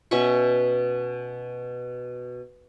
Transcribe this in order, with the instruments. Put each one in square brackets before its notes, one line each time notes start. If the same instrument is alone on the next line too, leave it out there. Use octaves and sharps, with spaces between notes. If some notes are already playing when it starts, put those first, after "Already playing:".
[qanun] B2 C#4 E5 C#6